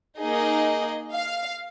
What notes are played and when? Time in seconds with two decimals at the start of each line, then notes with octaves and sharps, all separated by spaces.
0.19 A#3 D#4 G#4 D#5
1.15 F5